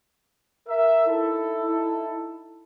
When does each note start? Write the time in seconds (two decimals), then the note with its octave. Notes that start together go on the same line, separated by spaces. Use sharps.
0.69 A#4 E5
1.07 D#4 E4 A4